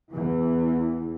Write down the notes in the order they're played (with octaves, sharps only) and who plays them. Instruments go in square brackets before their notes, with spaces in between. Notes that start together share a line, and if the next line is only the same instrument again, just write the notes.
[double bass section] E2 E3